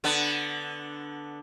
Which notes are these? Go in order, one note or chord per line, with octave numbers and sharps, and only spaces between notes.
D3 B3